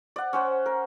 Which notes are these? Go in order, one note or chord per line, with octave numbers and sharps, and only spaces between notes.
D5 F#5
C#4 C5 F#5
A#4